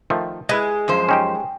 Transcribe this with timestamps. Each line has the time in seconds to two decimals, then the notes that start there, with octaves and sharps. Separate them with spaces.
0.10 D#3 F3 A3
0.49 G#3 E4 B4 D#5
0.88 F#2 F3 C5
1.09 C#4 D#4 G4 G5 G#5